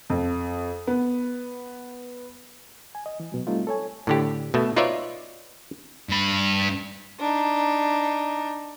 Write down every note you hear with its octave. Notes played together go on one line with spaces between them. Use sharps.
F2
B3
G#5
D#5
E3
B2 F#3
G3 A3 C4 D#4 F4
A4 C#5 G#5
A2 D3 G4
B2 A3
D#4 F4 B4 C#5 D5 E5
G2 B5
D4 D#4